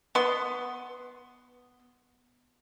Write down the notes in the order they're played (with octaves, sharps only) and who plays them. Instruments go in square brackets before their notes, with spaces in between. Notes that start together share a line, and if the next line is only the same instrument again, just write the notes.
[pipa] B3 C6